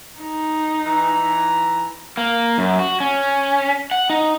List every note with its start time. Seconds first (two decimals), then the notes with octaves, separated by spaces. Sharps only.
0.21 D#4
0.84 E3 A#5
2.17 A#3
2.58 F#2
2.79 F#4
3.00 C#4
3.91 F#5
4.10 D#4